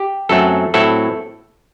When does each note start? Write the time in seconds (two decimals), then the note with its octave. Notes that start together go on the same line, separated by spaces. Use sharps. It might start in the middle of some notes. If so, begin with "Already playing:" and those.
Already playing: G4
0.29 F#2 F#3 A3 C4 A4
0.74 A2 F#3 C4 E4 A4